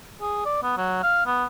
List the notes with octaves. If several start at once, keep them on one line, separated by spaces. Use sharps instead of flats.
G#4
D5
B3
F#3
F5
B3